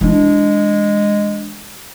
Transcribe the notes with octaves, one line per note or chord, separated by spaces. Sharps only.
E3 G#3 D4